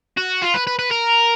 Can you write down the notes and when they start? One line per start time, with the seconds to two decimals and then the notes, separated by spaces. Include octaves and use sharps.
0.17 F#4
0.42 F4
0.54 B4
0.67 B4
0.79 B4
0.91 A#4